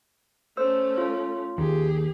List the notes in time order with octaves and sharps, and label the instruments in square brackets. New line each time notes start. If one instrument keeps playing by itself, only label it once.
[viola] A3 C#4 [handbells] C5 E6
[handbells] F4
[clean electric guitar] D#2 [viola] G4 G#4